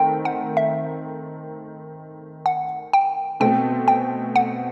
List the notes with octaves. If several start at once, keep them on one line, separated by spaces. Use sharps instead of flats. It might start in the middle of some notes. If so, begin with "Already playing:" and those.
Already playing: D#3 A3 C4 G5
F#5
E5
F#5
G5
B2 A3 C4 G5
G5
F#5